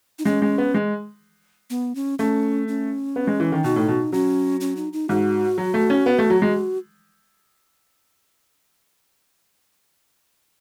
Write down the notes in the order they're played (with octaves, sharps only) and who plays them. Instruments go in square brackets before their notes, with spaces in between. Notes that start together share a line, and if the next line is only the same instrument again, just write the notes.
[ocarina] D#4
[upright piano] G#3 [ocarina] C#4
[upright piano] G#3
B3
G#3
[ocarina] B3
C#4
[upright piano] A3 [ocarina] C#4
[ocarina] C#4
[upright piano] B3
G#3
E3
D#3
[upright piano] B2 [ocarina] D#4
[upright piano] A2
B2
[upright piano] F#3 [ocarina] C#4
[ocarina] C#4
D#4
D#4
[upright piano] G#2 [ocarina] F#4
[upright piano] F#3
A3
C#4
B3
A3
F#3
G#3